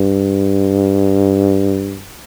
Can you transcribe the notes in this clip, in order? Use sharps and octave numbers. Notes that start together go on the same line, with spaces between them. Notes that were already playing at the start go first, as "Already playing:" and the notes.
Already playing: G2